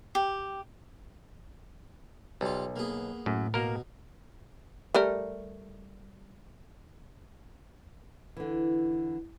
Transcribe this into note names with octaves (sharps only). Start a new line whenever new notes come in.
G4
B1 G3 F4
A#3 B3 G#4
F#2 A2
B2 A#3 A#4
G3 A3 A#4
D3 E3